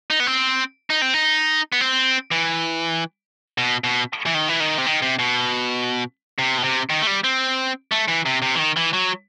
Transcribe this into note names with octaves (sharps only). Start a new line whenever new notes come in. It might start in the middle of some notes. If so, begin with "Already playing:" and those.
D#4
B3
C4
D#4
C4
D#4
B3
C4
E3
B2
B2
E3
D#3
E3
D#3
C3
D#3
C3
B2
C3
B2
C3
D#3
A3
G3
C4
A3
E3
C3
C3
E3
D#3
E3
F#3